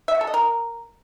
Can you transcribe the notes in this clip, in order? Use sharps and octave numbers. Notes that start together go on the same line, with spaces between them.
E5
F#4
A4
D#5
A#4